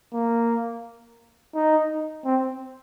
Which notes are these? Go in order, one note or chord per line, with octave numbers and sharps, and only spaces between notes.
A#3
D#4
C4